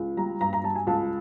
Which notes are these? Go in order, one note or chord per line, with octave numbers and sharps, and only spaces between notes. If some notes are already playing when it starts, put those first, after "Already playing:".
Already playing: C#2
G3 A#5
G2 A#5
A#5
G3 A5
G#5
C#2 A5